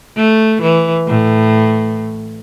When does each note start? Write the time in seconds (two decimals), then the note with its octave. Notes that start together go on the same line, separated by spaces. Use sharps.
0.16 A3
0.62 E3
1.08 A2